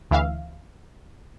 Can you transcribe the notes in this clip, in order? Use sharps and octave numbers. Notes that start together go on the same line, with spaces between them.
D2 E3 E5 F5